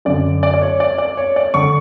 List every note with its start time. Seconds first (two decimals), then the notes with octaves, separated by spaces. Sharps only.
0.05 F#2 D3 D5
0.43 D5
0.54 D5
0.62 C#5
0.80 D5
0.98 D5
1.17 C#5
1.36 D5
1.54 D3 C#6